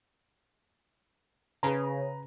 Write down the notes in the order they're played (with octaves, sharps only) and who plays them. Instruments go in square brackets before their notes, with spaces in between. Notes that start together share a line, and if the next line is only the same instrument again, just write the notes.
[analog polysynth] C#3 [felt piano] G#4 B4 A#5